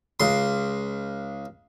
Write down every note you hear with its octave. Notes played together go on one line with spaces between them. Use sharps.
C#2 C6